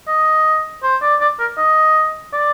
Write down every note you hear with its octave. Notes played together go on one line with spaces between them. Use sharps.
D#5
C5
D5
D5
A#4
D#5
D5